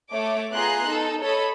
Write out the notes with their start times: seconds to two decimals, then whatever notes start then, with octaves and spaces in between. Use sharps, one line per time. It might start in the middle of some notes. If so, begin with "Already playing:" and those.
0.11 A3 C#5 D6
0.53 B3 F4 G#4 A#5 C6 F#6
0.88 D#4 A4
1.22 A4 C#5 D#5 B5